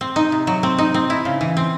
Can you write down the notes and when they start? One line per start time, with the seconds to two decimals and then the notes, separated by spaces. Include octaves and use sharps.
0.01 C4
0.16 D#4
0.32 C3
0.47 F#3
0.63 C4
0.78 D#4
0.94 C4
1.10 E4
1.25 C#3
1.41 E3
1.57 C4